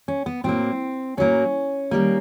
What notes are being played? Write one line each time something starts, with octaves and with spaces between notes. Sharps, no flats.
C#4
B3
A2 F#3 A#3 C4
A2 F#3 A#3 C#4
D#3 G3 A#3